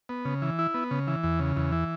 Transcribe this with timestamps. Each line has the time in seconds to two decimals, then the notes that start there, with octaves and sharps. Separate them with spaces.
0.09 B3
0.25 C#3
0.42 E3
0.59 E4
0.74 B3
0.91 C#3
1.07 E3
1.23 E2
1.40 C#3
1.56 E2
1.72 E3